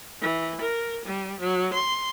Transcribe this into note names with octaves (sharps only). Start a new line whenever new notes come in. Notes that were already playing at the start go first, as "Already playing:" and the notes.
E3
A#4
G3
F#3
C6